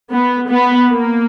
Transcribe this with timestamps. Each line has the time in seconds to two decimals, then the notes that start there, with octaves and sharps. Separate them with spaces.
0.12 B3
0.50 B3
0.91 A#3